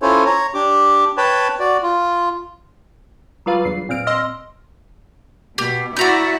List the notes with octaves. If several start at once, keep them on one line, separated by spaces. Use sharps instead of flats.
C#4 E4 F4 A4 C5 C#5
C#5 A#5
D4 G4 D6
B4 C#5 G5 A5 B5
F#4 D5
F4
F#3 G3 F4 B4 F5
G1 E2 C7
A#2 C4 F6 D7
D#5 C6 E6 F6 A#6
B2 G4
E4 F#4 D5 E5 A#5 G6